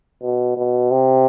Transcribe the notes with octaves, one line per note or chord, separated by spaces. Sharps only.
B2
B2
C3